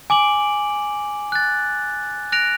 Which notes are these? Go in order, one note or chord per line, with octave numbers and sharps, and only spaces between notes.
G#5 D6 D7 F#7
F#6 A6
F#6 A#6 D7 F7